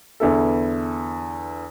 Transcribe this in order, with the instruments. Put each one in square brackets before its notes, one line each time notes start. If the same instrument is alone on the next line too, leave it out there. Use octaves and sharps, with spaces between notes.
[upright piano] E2 D3 B3 E4 A4